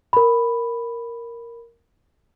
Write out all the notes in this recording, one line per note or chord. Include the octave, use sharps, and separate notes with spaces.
A#4 B5